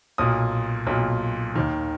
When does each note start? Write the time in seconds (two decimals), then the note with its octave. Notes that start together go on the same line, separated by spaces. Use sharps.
0.18 B1 A#2 D#6
0.87 B1 A#2
1.55 D#2 D#3